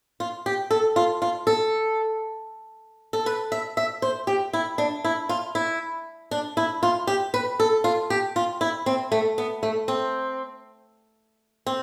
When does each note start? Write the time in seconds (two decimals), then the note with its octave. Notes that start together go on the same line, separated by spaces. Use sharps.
0.20 F4
0.46 G4
0.71 A4
0.96 F4
1.22 F4
1.47 A4
3.13 A4
3.26 B4
3.52 E5
3.77 E5
4.02 C5
4.27 G4
4.53 E4
4.78 D4
5.04 E4
5.29 F4
5.55 E4
6.31 D4
6.57 E4
6.83 F4
7.07 G4
7.34 B4
7.60 A4
7.84 F4
8.10 G4
8.36 F4
8.61 E4
8.86 C4
9.12 A3
9.38 B3
9.63 A3
9.88 C4
11.66 C4